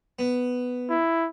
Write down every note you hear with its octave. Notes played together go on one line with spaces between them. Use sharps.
B3
E4